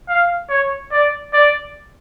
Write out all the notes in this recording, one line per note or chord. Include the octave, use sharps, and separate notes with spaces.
F5
C#5
D5
D5